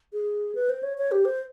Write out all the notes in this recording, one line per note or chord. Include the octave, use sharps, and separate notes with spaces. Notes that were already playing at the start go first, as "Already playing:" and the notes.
G#4
B4
C5
C#5
C#5
G4
C5